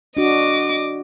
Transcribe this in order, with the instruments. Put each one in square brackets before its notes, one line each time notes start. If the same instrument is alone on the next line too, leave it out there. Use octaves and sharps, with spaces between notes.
[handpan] D4 F#4 [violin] D#5 D6